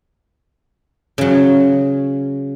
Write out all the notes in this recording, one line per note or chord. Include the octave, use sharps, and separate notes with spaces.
C#3 F#3